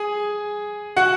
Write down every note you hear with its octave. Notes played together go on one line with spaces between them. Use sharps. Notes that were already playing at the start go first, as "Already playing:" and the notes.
Already playing: G#4 G#5
F#4 F#5